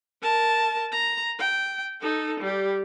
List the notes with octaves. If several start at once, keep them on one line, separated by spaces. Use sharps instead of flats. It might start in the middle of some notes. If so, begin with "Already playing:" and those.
A#4 A5
A#5
G5
D#4 A4
G3 G4